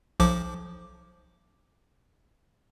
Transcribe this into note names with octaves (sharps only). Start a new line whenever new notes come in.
B1 F3 D6